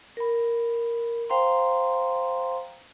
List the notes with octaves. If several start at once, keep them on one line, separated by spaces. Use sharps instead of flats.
A#4 B5
C5 F5 G5 A#5 C6